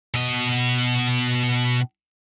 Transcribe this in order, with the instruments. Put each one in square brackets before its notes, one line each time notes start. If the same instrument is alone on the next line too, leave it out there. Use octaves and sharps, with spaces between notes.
[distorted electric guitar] B2 D#5